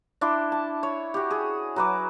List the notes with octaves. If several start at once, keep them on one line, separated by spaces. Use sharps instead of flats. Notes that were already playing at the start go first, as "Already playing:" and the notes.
D4 E4 C6 D6
A5
C#5
F#4 G4
G#4
F#3 B4 D6